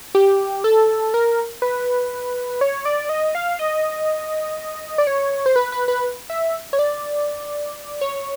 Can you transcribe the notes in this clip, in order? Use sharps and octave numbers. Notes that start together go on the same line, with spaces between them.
G4
A4
A#4
B4
C#5
D5
D#5
F5
D#5
D5
C#5
C5
B4
B4
B4
E5
C#5
D5
C#5